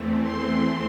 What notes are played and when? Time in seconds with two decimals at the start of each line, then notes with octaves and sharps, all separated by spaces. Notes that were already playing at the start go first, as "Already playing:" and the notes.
Already playing: E2 E3 A3 C4
0.21 C6